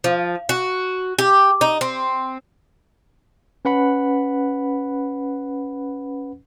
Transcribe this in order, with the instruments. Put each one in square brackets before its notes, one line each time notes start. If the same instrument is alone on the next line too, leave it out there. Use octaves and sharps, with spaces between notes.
[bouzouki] F3
F#4
G4
D#4
C4
[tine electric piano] C#4 B4 F#5 B5